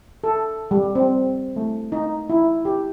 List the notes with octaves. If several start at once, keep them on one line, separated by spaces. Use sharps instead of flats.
A4
G3
C4
A3
D#4
E4
G4